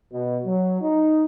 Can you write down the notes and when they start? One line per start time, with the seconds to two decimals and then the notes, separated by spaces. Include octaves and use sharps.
0.13 B2
0.46 F#3
0.82 D#4